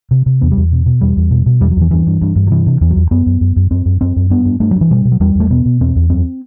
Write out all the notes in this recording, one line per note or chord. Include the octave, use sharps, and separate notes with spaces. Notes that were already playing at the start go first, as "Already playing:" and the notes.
C3
C3
E2 B3
G3
E2
B2
B2
E2 G3
E2
B2
B2
E2 G3
F#3
E2 E3
G2 E3
G2
G2
G2
F#3
C3 E3
C3
E2 E3
F#3
E2
F#2 B3
F#2
F#2
F#2
F#2 C4
F#2
F#2 C4
F#2
G2 B3
G2
G2 A3
G2 F#3
E3
B2 G3
B2
F#3
E2 G3
E2 A3
B2 B3
B2
E2 C4
E2
F#2 C4